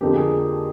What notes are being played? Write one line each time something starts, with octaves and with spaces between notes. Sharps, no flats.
F2 D3 F3 A#3 G4
G#4